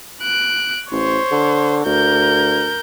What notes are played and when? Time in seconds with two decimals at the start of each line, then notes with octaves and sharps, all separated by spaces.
0.22 F#6 D7
0.91 A1 C5 C#5
1.31 D3
1.85 D2 A#4 G6